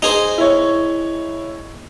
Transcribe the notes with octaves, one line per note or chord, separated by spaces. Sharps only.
D#4 G#4 C5
E4 C#5